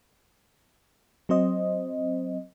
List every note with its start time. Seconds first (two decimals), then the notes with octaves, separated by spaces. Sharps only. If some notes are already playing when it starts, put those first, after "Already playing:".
1.29 F#3 C4 C5 D#5